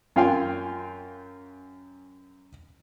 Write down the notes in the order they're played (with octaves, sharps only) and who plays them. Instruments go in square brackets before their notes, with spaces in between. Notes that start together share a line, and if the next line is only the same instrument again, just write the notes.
[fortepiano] F#2 F4 F5 G5 G#5 C6